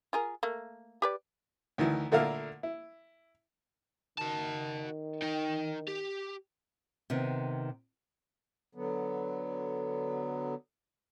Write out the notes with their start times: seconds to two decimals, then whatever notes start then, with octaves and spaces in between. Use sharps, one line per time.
0.13 F4 G#4 A#4
0.43 A3 A#3
1.02 G4 B4 D5
1.78 D2 D#3 E3
2.12 A#2 D3 A3 E4 A#4 F5
2.63 E4
4.18 D#3 F#4 A5
5.22 D#4 G5
5.88 G4
7.10 C3 D#3 B3
8.75 D3 F#3 B3